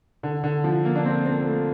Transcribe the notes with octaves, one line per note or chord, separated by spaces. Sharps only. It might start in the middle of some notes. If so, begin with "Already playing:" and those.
D3
D3
F3
A#3
D4
C4
C4
A3